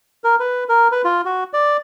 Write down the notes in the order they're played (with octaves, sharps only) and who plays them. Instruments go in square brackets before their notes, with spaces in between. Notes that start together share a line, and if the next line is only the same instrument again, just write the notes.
[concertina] A#4
B4
A#4
B4
F4
F#4
D5